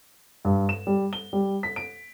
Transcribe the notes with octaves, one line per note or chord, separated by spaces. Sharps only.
G2
E7
G3
G7
G3
B6
D7